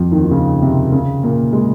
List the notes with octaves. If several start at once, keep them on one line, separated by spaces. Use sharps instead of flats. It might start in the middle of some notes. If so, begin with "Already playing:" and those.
Already playing: F2 F3
D#2 D#3
D#3
C#3
C3
C#3
A#2 A#3
G#3